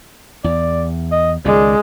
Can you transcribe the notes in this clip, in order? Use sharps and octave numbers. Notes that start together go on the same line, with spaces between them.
E2 D5
D#5
C#2 D#3 G#3 D5